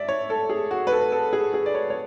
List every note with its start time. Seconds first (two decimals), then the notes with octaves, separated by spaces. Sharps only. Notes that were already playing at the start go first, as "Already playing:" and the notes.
Already playing: D5 E5
0.09 C#5
0.30 A4
0.49 G#4
0.71 F#4
0.87 B4
0.92 A4
1.12 A4
1.33 G#4
1.54 G#4
1.66 D5
1.75 C#5
1.90 C#5